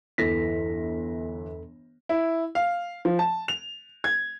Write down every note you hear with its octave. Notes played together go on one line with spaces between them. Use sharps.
G1 E2 E3 A4 A#6 B6
E4
F5
F3
A5
F7
G#6